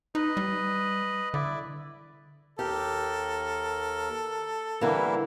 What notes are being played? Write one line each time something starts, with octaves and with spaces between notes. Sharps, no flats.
D#4 B4 D#5
G3
D3 E4 D5
D#2 G4 A4 A#4
D3 E3 G3 A#3 E4